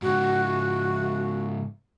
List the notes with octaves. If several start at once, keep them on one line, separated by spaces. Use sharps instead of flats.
G#2 C#3 F#4